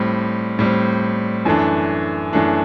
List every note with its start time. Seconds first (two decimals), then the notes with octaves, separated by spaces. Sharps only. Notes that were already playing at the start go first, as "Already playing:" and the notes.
Already playing: A2 G3 C4
0.59 A2 G3 C4
1.45 F#2 E3 A3 D4
2.33 F#2 E3 A3 D4